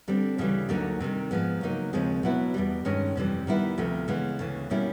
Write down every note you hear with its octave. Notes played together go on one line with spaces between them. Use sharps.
D3 G3 C4
D2 C#3 E3 G3
D2 D3 F#3 A#3 D#4
C3 D#3 G3
G#2 F3 G#3 B3
C#3 F#3 A#3 D#4
D#2 C#3 F3 G#3 C4
B2 F#3 B3 E4
E2 B2 G3
G2 D#3 G#3 C#4
F2 C3 E3 G3
D#3 G3 B3 E4
D2 C3 F3 A3
C#3 E3 G#3 B3
D2 C#3 E3
B2 G3 A#3 C#4 E4